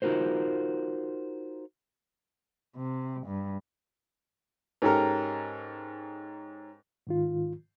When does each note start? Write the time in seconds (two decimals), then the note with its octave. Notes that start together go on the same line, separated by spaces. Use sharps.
0.02 D#4 F4 F#4 A#4 C5
2.77 C3
3.27 G2
4.82 G#2 C#4 G4 A4 A#4 F6
7.07 G#2 D#3 F4